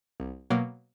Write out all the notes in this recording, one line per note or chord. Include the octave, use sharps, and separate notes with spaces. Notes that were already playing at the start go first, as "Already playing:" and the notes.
C2
B2 F#3 A#3